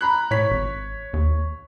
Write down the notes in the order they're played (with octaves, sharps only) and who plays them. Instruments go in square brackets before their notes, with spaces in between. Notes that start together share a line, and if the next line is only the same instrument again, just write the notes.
[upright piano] A#5 B5 F#6
[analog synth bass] A2 [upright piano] C#5 B6
[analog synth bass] G#1
D#2